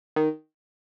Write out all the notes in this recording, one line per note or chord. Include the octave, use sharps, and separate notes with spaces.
D#3